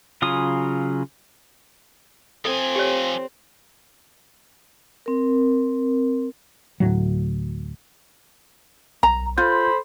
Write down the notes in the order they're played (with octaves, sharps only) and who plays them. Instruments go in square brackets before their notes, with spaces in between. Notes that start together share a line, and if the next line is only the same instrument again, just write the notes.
[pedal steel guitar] C#3 F#3 F4 G#5 D#6
[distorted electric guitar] F3 G#5 [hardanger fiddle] C4 [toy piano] A4
[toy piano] G4 C#5
[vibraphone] C4 A#4
[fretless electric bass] D2 A2 F#3
[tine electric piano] B1 [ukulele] A#5
[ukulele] F4 [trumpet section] A4 C5 B5 [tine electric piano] G6